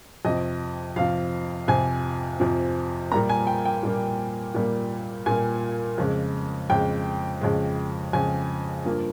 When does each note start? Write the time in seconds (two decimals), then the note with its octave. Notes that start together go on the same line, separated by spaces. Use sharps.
0.25 F2 C3 F3 D#5
0.96 F2 C3 F3 F5
1.68 F2 C3 F3 G#5
2.40 F2 C3 F3
3.11 A#2 G3 A#3 A#5
3.29 G#5
3.47 G5
3.65 G5
3.83 A#2 G3 A#3
4.55 A#2 G3 A#3
5.26 A#2 G3 A#3 G#5
5.98 F2 C#3 G#3
6.70 F2 C#3 G#3 G5
7.41 F2 C#3 G#3
8.13 F2 C#3 G#3 G#5
8.85 G2 F3 A#3